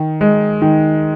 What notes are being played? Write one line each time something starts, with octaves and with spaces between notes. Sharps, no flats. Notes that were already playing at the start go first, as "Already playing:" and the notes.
Already playing: D#3
G#3
D#3